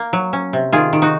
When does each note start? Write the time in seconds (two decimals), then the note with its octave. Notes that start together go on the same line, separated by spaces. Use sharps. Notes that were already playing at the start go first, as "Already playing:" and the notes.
Already playing: A#3
0.13 F#3
0.33 C#4
0.53 C3
0.73 D#3 F4 G#4
0.93 D#3
1.02 D#4 F#4